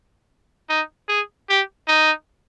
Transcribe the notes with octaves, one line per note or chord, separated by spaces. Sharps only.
D#4
G#4
G4
D#4